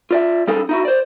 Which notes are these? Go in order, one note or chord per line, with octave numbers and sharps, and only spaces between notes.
F4 D5 E5
G3 C#4 D#4 G#4 A4 F5
D#4 E4 F#4
C5 D5